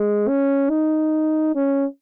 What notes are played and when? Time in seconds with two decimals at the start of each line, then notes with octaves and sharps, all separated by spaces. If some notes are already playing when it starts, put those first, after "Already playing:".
Already playing: G#3
0.28 C#4
0.70 D#4
1.55 C#4